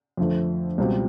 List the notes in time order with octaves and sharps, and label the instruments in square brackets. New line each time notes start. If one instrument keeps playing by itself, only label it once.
[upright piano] F2 D3 F3 A3
C#2 B2 G3 C4 F4